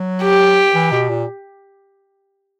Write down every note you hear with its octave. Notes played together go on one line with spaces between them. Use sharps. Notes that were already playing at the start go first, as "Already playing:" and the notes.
Already playing: F#3
G4
E3
B2
A#2